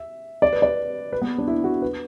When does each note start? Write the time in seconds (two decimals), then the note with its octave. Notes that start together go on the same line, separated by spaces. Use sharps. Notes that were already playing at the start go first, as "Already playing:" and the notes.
Already playing: E5
0.42 D5
0.53 B4
0.62 D5
1.12 B4
1.22 B3
1.38 D4
1.47 E4
1.64 F#4
1.82 B4